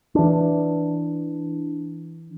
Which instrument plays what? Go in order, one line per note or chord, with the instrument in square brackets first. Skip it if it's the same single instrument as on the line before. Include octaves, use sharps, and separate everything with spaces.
[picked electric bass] E3 D4